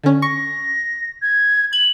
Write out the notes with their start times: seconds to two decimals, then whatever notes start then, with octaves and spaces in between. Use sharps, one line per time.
0.04 D3 C#4
0.22 C#6 A#6
1.22 G#6
1.73 G#6 F#7